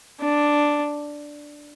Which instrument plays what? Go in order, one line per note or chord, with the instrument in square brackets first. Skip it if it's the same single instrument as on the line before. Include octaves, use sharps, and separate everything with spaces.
[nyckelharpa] D4